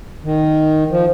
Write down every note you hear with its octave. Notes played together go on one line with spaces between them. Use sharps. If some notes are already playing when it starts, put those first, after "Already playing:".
D#3
F3